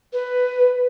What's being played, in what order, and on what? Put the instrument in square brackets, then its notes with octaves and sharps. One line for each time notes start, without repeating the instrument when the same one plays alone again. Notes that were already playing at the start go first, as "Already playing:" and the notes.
[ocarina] B4